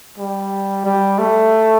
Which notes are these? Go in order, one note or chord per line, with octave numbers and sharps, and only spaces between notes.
G3
G3
A3